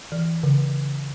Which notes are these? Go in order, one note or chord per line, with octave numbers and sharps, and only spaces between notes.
E3
C#3